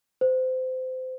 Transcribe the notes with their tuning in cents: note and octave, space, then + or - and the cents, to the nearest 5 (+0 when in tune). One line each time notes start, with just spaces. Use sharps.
C5 -25